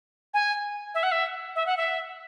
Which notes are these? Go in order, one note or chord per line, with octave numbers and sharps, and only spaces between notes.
G#5
E5
F#5
E5
E5
F#5
E5